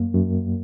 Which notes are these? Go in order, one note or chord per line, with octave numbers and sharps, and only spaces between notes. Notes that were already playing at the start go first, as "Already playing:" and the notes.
Already playing: F#2 A#3
F#2